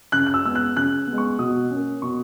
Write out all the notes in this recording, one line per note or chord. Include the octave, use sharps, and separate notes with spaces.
C#3 F#6
F#6
E6
G#3 B3 E6
F#6
C#3 F#6
G#3 B3
C#6
B2 D#6
A#3 C#4
B2 C#6